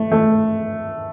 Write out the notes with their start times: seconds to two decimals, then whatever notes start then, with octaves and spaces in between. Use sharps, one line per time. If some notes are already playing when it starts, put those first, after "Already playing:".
Already playing: A3
0.12 A3